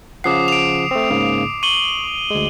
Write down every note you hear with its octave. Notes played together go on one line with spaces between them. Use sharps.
C#3 F3 F#5 D6 D#6 C7
D7 F7
A3 C4
G#2 C#3 A#3
C#6 D#7 F#7 G7
D2 G#3